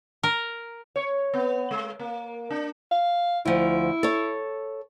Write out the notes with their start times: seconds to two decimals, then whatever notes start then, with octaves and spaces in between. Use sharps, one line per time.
0.23 A#4
0.96 C#5
1.34 B3
1.71 G#3
1.99 A#3
2.50 D4
2.91 F5
3.45 D2 F3 E4
4.03 A4 C#5